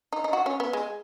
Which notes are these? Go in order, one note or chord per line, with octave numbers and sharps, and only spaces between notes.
D#4
D#4
F#4
C#4
B3
G#3